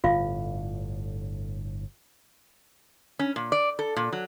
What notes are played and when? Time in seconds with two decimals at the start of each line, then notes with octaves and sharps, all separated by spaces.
0.04 G1 A2 D3 F4 F5
3.19 C#4
3.36 A#2
3.52 D5
3.79 A4
3.96 A#2
4.13 F#3